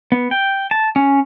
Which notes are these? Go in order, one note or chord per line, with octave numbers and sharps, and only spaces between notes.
B3
G5
A5
C#4